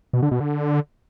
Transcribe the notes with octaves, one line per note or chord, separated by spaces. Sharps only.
B2
D3
B2
D3